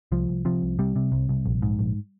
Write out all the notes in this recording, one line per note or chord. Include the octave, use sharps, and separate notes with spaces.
C2 F3
C2
C3 F3
C2
C3 G3
C3
C2
C2
A#1
G#2
A#1